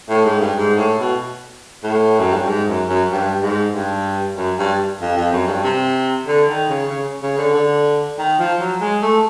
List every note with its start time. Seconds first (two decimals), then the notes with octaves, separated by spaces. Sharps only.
0.09 A2
0.25 G#2
0.41 G2
0.57 G#2
0.77 A2
0.99 B2
1.83 A2
2.19 F#2
2.33 G2
2.47 G#2
2.68 F#2
2.89 F#2
3.10 G2
3.42 G#2
3.74 G2
4.37 F#2
4.59 G2
5.01 F2
5.17 F2
5.32 F#2
5.48 G2
5.64 C3
6.27 D3
6.49 D#3
6.69 C#3
6.90 C#3
7.22 C#3
7.38 D3
7.54 D3
8.18 D#3
8.39 F3
8.60 F#3
8.81 G#3
9.02 A3